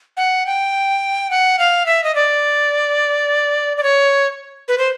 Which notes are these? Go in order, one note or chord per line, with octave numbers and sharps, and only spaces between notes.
F#5
G5
F#5
F5
E5
D#5
D5
D5
C#5
B4
C5